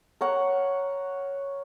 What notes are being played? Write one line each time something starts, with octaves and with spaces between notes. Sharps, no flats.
A#4 C#5 F#5